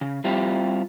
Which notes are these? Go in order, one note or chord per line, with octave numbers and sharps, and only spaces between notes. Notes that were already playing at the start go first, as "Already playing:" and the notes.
C#3
G3 C4 E4 F4 G4